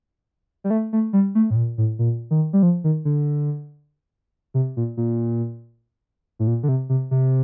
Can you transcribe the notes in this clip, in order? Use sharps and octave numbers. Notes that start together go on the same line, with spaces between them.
G3
A3
A3
G3
A3
A2
A#2
A2
A#2
D#3
G3
F3
D#3
D3
C3
A#2
A#2
A2
A#2
D3
C3
C3
C3